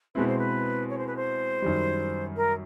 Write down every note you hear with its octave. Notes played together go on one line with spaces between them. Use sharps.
B2 G#3 C4 E4 B4
C5
B4
C#5
C5
B4
C5
F#2 D#3 G3
A#4